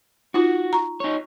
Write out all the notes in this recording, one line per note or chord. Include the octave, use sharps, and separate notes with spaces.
D#4 F4 F#4
A#5 C#6
D#4 C#5